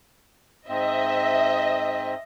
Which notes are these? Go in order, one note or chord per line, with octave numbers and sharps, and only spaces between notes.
G#2 C4 D#5 E5